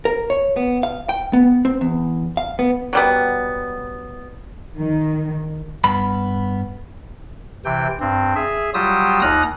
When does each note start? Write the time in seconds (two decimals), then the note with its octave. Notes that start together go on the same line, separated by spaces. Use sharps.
0.05 A#4
0.30 C#5
0.57 B3
0.83 F5
1.09 G5
1.33 B3
1.65 C4
1.81 E2
2.37 F5
2.59 B3
2.93 F#3 G3 B3
4.77 D#3
5.84 G2 B3 B5
7.65 C3 E3 G5
8.00 G2 C4
8.36 G#4 E5
8.74 F#3 G3 F4 G4 D#6 E6
9.22 D#2 D#4 A#5 D#6 F6 F#6